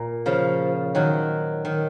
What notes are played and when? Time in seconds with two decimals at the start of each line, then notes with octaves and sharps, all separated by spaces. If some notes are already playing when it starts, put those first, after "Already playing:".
Already playing: A#2
0.26 C#3 F3
0.95 D#3 F#3
1.65 D#3